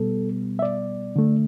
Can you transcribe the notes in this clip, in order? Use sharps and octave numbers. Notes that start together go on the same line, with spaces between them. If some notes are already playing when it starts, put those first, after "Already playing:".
Already playing: B2 G3 B3 A4
E5
D5
D3 A3